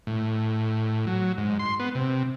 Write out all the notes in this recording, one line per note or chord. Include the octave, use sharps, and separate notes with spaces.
A2
F#3
G#2
C6
B3
C3